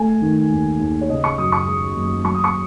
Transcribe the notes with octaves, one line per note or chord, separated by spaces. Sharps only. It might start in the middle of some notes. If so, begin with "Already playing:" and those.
Already playing: A3 G#5
D#3
D#2
D#2
C#5
C#3 D#5
C#6
F#2 D#6
C#6
G#3 D#6
F#1
F#3 C#6
D#6
C#6